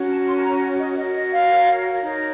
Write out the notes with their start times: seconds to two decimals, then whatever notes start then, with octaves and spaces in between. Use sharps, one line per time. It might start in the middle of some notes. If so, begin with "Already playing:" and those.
Already playing: C#4 F#4 A#4 C#5
0.09 A5
0.27 C6
0.36 A5
0.44 A#5
0.62 F#5
0.79 D#5
0.97 F#4 A#4 C#5 D#5
1.14 D#5
1.32 F5
2.01 D#4 A#4 C#5